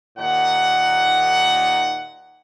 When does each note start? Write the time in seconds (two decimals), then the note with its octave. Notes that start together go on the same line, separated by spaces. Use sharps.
0.18 D#2 A#2 D#4 F#5